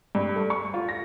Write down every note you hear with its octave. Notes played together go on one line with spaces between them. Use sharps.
G2
A3
C#6
F4
A#6